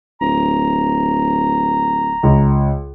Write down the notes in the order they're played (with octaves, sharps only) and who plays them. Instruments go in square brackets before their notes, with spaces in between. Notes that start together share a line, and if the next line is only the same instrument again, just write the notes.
[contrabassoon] D1 [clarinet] A#5
[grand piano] C#2